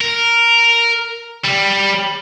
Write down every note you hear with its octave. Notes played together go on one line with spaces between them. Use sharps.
A#4
G3